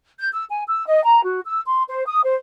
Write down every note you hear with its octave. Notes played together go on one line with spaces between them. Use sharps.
G6
E6
G#5
E6
D#5
A#5
F#4
E6
C6
C5
D#6
C5